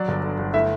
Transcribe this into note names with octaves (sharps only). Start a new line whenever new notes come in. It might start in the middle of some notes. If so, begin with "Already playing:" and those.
Already playing: F#3 D5
G1
D3
G1
A3 E4 E5